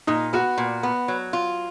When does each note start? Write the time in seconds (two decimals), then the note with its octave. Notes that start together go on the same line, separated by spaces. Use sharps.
0.07 A#2 D#4
0.33 B3 F#4
0.58 A#2
0.83 B3
1.08 F#3
1.33 F4